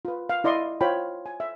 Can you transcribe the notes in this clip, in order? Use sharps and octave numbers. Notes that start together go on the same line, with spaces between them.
F4 B4
F5
E4 D5 D#5 C6
F4 C5 C#5 G5 B5
G#5
E5